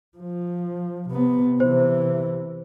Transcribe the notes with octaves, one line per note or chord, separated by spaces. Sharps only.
F3
C3 B3
C3 E3 C5